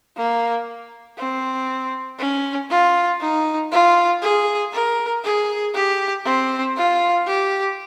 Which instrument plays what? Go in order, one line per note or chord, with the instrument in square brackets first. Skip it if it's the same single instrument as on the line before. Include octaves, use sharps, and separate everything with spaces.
[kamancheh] A#3
C4
C#4
F4
D#4
F4
G#4
A#4
G#4
G4
C4
F4
G4